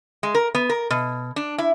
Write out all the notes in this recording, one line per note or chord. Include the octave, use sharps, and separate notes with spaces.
G#3
A#4
B3
A#4
B2
D4
E4